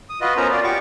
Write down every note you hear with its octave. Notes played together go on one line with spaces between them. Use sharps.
D#6
F4 F#4 B4 D#5
B3 C#4 A#4 C5 A#5
F4 D5
F#4 G4 C#6 D6